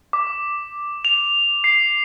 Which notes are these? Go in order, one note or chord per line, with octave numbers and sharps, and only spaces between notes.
D6
F7
C7